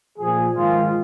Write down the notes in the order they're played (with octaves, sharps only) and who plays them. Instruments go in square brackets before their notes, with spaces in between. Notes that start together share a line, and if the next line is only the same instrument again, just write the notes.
[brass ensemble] A#2 F3 G#4
G#2 D#3 F4